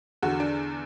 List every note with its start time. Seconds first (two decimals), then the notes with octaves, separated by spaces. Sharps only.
0.23 E2 D3 F#4
0.40 D4